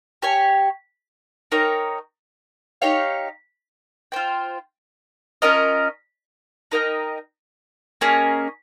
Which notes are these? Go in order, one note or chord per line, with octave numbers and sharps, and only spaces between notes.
G4 C#5 G#5
D#4 A#4 C#5 G5
D#4 G4 C#5 F5
F4 C5 G5
C#4 F4 A#4 D#5
D#4 A#4 D#5 G5
A#3 C#4 G#4 D#5